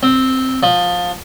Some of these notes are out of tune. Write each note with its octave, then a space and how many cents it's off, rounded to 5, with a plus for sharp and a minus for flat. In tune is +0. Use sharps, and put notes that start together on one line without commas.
C4 +0
F3 +20